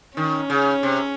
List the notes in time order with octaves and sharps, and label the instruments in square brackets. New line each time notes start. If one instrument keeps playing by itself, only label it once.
[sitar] D#3 [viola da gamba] C#4
[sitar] C#3
C3